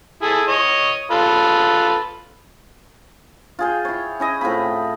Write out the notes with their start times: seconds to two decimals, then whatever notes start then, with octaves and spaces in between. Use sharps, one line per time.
0.22 E4 G#4 A4
0.48 C#5 D#5
1.11 F4 A4 B4
3.59 F4 G#4 G5
3.85 E4 C#5
4.20 C#4 E4 D#5
4.41 A2 C4 F4 B5